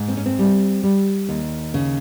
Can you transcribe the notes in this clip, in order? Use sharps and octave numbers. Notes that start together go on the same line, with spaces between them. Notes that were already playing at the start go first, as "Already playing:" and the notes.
Already playing: G#2
C4
C#4
C4
G3
G3
D#2
C#3